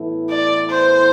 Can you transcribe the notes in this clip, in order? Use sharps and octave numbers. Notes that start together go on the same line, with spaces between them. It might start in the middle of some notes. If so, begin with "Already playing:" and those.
Already playing: A2 E3 B3 E4 A4
D5
C5